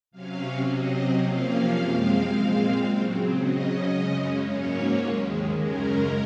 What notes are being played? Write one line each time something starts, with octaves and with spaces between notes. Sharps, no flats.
C3 F#3 C#4 F5
C3 F#3 C4 D#5
C3 F3 A#3 C#4 F5
F#2 F3 G#3 C4
A#2 G#3 C4
C#3 F#3 C4
C#3 F#3 C#4 D#5
F#2 C#3 G#3 C#4
G#2 F#3 A#3 C#4 C#5
D#2 D#3 G#3
F#2 C#3 G#3 C#4 A#4